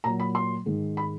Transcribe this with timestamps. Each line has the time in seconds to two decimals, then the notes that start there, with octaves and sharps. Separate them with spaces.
0.04 A#2 F#3 A#5
0.20 B5
0.35 C6
0.66 G#2 D#3 G#3
0.97 B5